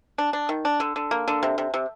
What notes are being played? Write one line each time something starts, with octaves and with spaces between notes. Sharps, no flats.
D4
D4
D#3
D4
D3
D3
A#3
D3
C3
C3
C3